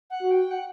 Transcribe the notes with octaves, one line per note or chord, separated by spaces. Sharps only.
F#5
F#4
G5
F#5